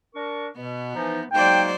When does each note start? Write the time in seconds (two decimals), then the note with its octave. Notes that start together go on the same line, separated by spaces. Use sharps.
0.15 D4 A#4 C#6
0.56 B2 B3
0.95 E3 F3 D#4
1.33 F#3 G#3 A#3 D#4 C5 D5 G5